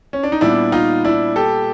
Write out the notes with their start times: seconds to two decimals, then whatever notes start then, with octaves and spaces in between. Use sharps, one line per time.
0.13 C#4
0.23 D4
0.32 D#4
0.41 A#2 G3 B3 D4 E4
0.72 D#4 F4
1.05 D4 E4
1.36 G4 A4